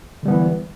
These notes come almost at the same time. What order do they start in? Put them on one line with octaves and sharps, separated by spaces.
D3 G3 B3 E3